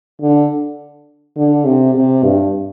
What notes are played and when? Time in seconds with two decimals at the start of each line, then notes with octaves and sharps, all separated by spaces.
0.21 D3
1.37 D3
1.66 C3
1.94 C3
2.23 G2